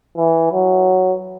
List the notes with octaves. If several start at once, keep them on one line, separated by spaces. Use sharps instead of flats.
E3
F#3